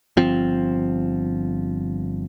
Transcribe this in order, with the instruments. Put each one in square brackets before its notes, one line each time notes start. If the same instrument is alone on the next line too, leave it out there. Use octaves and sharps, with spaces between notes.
[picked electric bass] G1 F3 C4